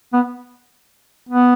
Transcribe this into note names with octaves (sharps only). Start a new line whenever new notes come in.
B3
B3